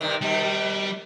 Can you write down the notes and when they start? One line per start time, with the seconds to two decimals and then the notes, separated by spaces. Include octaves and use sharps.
0.01 G2 C3 D#3
0.22 B2 D#3 G3